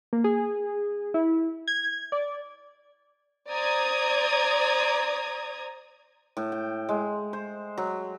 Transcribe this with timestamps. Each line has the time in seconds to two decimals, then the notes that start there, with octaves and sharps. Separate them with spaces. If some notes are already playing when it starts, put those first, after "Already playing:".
0.13 A#3
0.24 G#4
1.14 E4
1.68 G#6
2.12 D5
3.50 C5 D5 A#5 D#6 G#6
6.37 A2
6.52 G5
6.89 G#3
7.33 C5
7.78 F#3